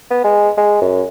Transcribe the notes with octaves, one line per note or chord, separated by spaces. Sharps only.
B3
G#3
G#3
F#2